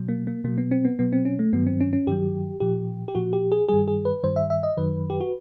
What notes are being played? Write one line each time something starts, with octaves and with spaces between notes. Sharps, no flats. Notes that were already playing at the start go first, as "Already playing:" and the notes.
Already playing: B2 F#3
A#3
A#3
B2 F#3 A#3
B3
C4
B3
B2 F#3 B3
C4
C#4
A3
G2 D#3 F#3 B3
C4
C#4
C#4
G2 D#3 F#3 G4
A#2 F3 G4
G4
A#2 F3 F#4
G4
G#4
G2 D#3 G3 G#4
G#4
B4
G2 D#3 G3 C5
E5
E5
D#5
F#2 D#3 F#3 B4
G4
F#4